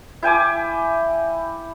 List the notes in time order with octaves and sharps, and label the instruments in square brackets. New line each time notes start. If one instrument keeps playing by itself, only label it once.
[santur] E4 G5 G#5 D6